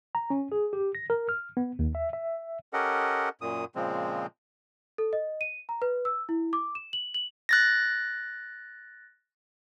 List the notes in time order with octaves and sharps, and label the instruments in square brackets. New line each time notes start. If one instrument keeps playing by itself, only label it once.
[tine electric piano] A#5
C#4
G#4
G4
A#6
A#4
F6
B3
D#2
E5
E5
[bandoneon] C#4 G4 A4 A#4 D#5 F#5
F#2 A#2 D#6
A#2 C#3 F3 G#3 C4
[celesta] A4
D#5
D#7
A#5
B4
E6
E4
D6
E7
F#7
F#7
[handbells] F#6 A6 A#6